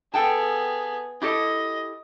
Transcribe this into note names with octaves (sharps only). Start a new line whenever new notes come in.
B3 G#4 A4 G5 A5
E4 G4 A4 D#5